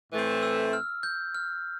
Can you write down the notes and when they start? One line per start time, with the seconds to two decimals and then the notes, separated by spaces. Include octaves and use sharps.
0.11 A2 E3 A3 C4
0.43 E6
0.73 F6
1.03 G6
1.35 F6